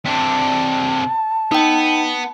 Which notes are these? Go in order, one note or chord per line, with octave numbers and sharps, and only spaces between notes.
C3 D4 A5
B3 D#4 G5